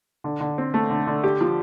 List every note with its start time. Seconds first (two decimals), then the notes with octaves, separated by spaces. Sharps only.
0.24 D3
0.40 D3
0.58 C4
0.74 A3
0.90 D3
1.07 D3
1.24 G4
1.41 F3